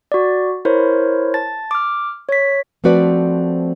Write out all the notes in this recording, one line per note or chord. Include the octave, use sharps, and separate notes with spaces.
F#4 D5
E4 A#4 C5 C#5
A5 A6
D6 F6
C#5 B6
F3 A3 C4 F#4 B4 D5